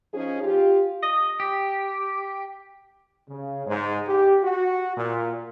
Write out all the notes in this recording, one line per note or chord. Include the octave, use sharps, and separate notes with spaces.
F3 C#4 D#4 G#4
F4 G4
D#5
G4
C#3
G#2
G4
F#4
A#2